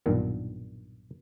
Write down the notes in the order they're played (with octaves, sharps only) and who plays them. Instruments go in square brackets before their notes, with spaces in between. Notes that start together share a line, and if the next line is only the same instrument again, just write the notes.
[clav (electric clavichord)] B1 G2 A#2 D#3